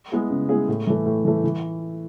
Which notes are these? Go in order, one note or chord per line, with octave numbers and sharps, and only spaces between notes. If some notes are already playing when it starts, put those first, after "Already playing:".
G#3 B3 E4 G#4
C#3
G#3 B3 E4 G#4
A2
E3 A3
A2
E3 A3
E3